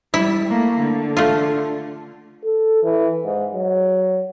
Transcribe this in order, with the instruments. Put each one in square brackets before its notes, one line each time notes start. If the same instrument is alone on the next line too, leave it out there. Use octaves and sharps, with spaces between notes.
[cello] G3 [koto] E4
[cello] A3 A#3
D3
[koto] A3 F4
[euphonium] A4
E3
G#2
F#3